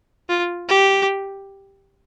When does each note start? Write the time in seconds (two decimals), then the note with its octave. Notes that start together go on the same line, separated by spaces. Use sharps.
0.29 F4
0.69 G4